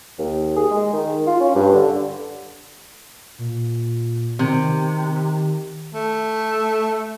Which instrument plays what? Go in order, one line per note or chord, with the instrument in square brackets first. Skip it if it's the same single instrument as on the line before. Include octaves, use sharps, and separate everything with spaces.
[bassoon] D#2
G#4
G#3
D#3
F4
C#4
G2
D3
[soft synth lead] A#2
[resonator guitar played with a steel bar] C3 [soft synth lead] D#3
[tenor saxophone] A3